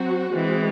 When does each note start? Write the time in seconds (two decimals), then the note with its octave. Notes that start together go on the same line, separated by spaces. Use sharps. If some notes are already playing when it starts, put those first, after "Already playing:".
Already playing: F#3 C4 F#4
0.32 E3 G#3 C4